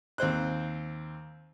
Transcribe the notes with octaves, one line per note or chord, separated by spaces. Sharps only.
D#2 C4 C5 F#6